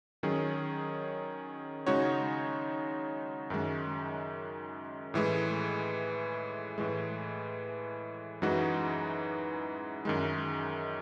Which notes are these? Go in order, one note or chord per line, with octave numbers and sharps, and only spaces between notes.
D#3 F#3 C#4 G#4
C#3 G#3 D#4 F#4 C#5
F#2 D#3 G#3
A2 E3 G#3
A2 E3 G#3
F#2 E3 G#3 D#4 F#4
F#2 D#3 G#3